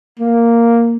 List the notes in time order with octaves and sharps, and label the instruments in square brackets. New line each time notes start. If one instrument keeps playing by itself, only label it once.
[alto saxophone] A#3